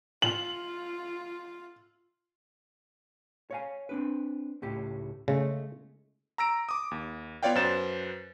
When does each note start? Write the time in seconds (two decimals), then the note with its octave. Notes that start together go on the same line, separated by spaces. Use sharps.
0.22 F4 F#7
3.51 C#5 F5 G#5
3.89 C4 D4 B4
4.62 C#2 A2 G4
5.28 C#3 G#3 A3
6.38 A#5 E6 A#6 D7
6.69 D6 D#6
6.91 D#2
7.43 B3 F4 C#5 D5 F5 G5
7.55 F#2 B4 C5 A6 E7